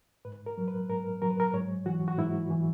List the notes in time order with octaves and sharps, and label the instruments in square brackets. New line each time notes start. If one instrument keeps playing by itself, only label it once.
[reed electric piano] G#2 B4
A#4
F#3
B4
G#2 A#4
F#3 A#4
B4
A#4
G#2 C#5
E3 F#4
F#4
G#2 E4
E3